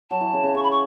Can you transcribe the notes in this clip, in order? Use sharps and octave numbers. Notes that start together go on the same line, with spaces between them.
F#3 A5
E3
C#3
C#3
C#3 C#6
B5
C#6